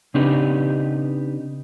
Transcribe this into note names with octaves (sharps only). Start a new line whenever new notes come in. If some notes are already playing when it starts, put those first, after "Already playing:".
C#3 C4 D4 D#4 G4 B4